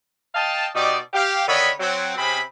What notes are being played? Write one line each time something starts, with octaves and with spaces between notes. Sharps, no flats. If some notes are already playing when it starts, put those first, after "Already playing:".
D#5 F5 G5 A5
B2 D#4 G4 D5
G4 F5
D3 D#3 C#5 D#5 B5
F#3 C4
C3 C4 C#4 G#4 B5